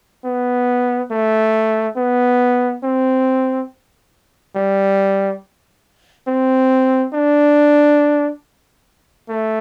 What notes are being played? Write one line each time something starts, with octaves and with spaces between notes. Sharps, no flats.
B3
A3
B3
C4
G3
C4
D4
A3